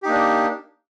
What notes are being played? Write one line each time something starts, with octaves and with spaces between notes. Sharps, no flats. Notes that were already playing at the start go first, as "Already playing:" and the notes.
A#3 D4 D#4 G4